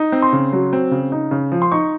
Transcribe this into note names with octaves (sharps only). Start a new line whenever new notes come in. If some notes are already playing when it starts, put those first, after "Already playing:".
Already playing: D#4
C4
C6
C#3
F#3
C4
C#3
D#4
C#3
F3
C6
D#4 C#6